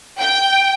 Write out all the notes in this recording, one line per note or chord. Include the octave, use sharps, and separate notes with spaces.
G5